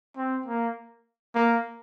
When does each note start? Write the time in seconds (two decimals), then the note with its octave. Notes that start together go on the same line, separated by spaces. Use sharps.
0.17 C4
0.46 A#3
1.35 A#3